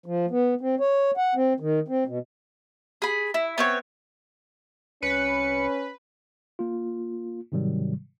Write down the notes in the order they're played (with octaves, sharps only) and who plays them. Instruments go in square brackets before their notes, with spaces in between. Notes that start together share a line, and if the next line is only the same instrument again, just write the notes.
[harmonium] F3
B3
C4
C#5
F#5
C4
D#3
C4
B2
[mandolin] G#4 B5
E4
B3 C4 C#5
[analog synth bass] C2 [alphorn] C#4 [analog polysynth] B4 [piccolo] C#7
[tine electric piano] A#3 F4
G#2 C3 D#3 F#3 G3